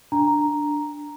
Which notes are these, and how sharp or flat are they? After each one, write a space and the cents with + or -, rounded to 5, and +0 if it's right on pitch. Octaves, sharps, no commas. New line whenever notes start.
D4 +0 A#5 +0